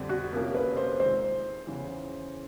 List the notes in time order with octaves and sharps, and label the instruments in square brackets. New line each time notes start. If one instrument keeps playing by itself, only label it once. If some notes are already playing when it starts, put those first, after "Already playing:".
Already playing: [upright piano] F2 D3 G3 C4
[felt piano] F#4
[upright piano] C2 C3 F3 A#3 C#4 [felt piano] A#4
[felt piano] B4
C5
[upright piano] D#3 G#3 C4 [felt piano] C5
[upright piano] E2 C#3 E3